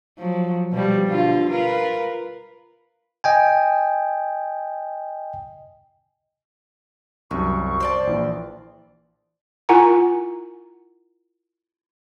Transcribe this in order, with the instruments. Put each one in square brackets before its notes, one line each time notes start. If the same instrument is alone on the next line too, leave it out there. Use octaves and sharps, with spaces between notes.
[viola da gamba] F3 F#3
B2 F3 G3
B2 D3 F4
F4 A#4 B4
[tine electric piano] D#5 G5 G#5
[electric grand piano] C2 F#2 [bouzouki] D#3 [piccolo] C#6
[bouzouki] C5 D5 A5
[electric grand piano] A#1 E3
[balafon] E4 F4 A#4 F#5 G#5 A#5